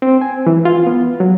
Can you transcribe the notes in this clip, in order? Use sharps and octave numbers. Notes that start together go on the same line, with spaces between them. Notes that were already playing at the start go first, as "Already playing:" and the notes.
C4
G#5
E3
F4
B3
F#3